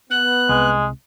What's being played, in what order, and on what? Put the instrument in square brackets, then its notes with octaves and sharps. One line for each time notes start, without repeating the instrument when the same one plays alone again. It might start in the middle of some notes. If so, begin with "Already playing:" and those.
[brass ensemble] B3 [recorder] F#6
[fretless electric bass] C2 [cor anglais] G#3